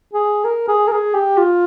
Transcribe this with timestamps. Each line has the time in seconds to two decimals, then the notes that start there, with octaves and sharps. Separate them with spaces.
0.13 G#4
0.44 A#4
0.68 G#4
0.87 A#4
0.92 G#4
1.14 G4
1.38 F4